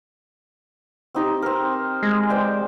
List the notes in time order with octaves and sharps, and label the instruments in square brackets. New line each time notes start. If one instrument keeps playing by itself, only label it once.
[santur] C4 D#4 G4
C4 A#4
[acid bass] G#3
[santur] C5 D5 G5